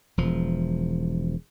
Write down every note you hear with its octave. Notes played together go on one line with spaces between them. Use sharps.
E1 F3